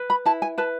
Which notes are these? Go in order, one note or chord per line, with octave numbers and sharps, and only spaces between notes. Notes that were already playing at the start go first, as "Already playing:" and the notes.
Already playing: B4
B5
E4 A5
G#5
B4 A5